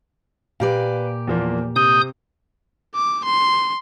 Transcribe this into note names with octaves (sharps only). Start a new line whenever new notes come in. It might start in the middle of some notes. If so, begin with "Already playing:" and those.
A#2 G4 B4 D5 F5
E2 F3 A#3
C3 D#6 G6
D6
C6